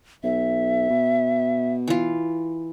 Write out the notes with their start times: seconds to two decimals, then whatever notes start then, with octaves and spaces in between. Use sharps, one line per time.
0.24 B1 E5
0.90 B2
1.88 E3 F4